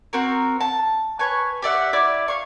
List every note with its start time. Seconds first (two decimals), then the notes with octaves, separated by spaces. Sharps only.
0.13 C4 F#4 A#4
0.61 A5
1.19 B4 C#5 G#5
1.62 G4 D5 E5 F#5
1.93 E4 D5 D6
2.28 F5 C#6